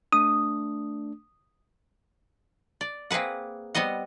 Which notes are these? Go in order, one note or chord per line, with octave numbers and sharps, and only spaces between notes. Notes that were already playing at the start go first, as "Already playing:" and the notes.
A3 D4 D#6
D5
A#3 C4 G#4 B4 F#5
G3 B3 C4 D#5 F#5